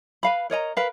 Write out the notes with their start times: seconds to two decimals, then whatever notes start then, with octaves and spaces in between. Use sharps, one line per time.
0.23 B4 F5 B5
0.50 A#4 C#5 D#5 A#5
0.77 A#4 B4 F5